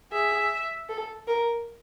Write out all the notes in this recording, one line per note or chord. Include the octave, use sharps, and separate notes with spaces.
G#4 E5
A4
A#4